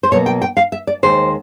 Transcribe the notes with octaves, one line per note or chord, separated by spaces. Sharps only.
C5
B2 F#3 A#3 C#5
G5
G5
F5
E5
D5
D#2 D#3 G#3 C5